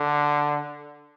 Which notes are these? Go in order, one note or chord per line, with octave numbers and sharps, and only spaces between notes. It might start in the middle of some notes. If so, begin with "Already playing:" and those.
Already playing: D3